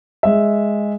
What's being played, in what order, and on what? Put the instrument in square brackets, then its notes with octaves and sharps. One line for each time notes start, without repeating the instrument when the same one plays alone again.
[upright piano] G#3 E5